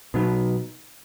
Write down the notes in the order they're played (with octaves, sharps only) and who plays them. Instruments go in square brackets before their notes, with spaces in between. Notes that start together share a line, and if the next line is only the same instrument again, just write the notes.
[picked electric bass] B2 F#3 B3 [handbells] D#4